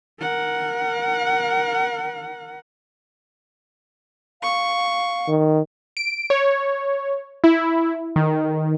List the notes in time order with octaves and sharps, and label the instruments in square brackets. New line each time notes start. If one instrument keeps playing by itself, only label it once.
[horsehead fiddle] A#4 F#5
[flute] F5 [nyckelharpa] C#6
[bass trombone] D#3
[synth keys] D7
C#5
E4
D#3